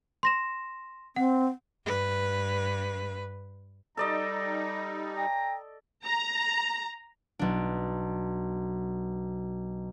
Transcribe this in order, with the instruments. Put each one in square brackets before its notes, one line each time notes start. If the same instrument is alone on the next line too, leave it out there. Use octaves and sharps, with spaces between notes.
[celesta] C6 A#6 E7
[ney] C4 [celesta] F#5
[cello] G2 B4
[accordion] G3 D#4 [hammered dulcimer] A4 D5 D#5 [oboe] A#5
[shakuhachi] G5 [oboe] A#5
[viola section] A#5
[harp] B1 D4